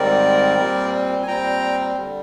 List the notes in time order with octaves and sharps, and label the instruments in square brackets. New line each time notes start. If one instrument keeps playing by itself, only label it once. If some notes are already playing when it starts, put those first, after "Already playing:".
Already playing: [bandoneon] G#2 D#3 G3 C4 A#4 D5
A#2 G3 C4
G#5
A#2 G3 C4 G5 A#5
D3 G3